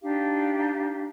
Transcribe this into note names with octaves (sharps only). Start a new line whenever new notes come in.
D4 D#4 G4 F5